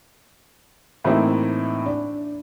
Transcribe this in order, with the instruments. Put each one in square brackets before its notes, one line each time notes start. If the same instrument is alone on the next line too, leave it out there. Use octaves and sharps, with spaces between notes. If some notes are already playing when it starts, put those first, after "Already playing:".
[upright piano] A2 E3 A#3 C4 D#4 E4
D4